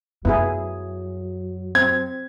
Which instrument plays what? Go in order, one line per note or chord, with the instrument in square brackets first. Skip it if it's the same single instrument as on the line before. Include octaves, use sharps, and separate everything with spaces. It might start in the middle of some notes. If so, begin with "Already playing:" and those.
[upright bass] F#2 [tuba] F#3 [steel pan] B3 E4 G#4
[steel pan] C4 [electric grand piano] G#6